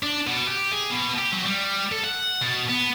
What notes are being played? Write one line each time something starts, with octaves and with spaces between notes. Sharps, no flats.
D4
B2
G4
G#4
B2
G4
F#3
G3
A4
F#5
B2
B3